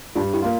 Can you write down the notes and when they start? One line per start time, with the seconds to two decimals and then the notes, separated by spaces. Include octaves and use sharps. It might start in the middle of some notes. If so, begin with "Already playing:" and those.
0.16 G2 D4 F4
0.34 E4 G4
0.42 A#3 F4